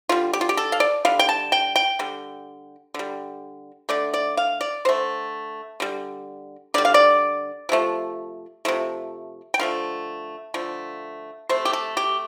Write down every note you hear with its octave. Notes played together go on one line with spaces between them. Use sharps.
D3 G3 F4
G4
F4
G4
A4
F5
D5
D3 G3 F5
G5
A5
G5
G5
D3 G3
D3 G3
D3 A3 D5
D5
F5
D5
D3 A3 C5
D3 G3
D3 G3 D5
F5
D5
C3 F3 A3
C3 F3 A3
G5
D3 F3 A3 F5
D3 F3 A3
C3 A3 C5
G4
A4
G4